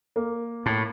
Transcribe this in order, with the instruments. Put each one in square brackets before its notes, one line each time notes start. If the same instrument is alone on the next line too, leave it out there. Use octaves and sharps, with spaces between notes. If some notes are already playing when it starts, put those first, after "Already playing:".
[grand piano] A#3
[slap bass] A2